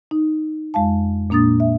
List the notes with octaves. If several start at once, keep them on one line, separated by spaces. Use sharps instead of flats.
D#4
F2 G#3 F5 A5
A#2 A#3 D4 D#6 A6
E5